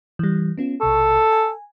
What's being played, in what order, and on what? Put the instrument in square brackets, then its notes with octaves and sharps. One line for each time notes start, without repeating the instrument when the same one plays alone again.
[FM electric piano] E3 G3
B3 C#4 F4
[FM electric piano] B1 C3 C#6 [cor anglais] A4
[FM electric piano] G#5